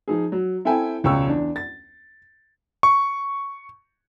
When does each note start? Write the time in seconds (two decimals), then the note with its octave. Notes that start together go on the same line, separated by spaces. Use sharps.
0.08 F3 D#4 G#4
0.32 F#3
0.65 C4 E4 A4 E5 G5 G#5
1.04 E1 C#2 C#5 G5 C#6 E6
1.27 E2 D4
1.56 A6
2.83 C#6